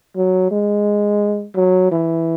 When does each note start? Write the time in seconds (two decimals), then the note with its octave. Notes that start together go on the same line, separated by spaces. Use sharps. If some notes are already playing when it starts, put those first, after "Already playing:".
0.17 F#3
0.51 G#3
1.56 F#3
1.92 E3